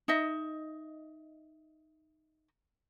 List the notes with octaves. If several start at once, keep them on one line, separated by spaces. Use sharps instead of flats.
D#4 D#5 E5